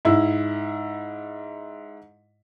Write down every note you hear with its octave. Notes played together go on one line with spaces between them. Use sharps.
G#2 E4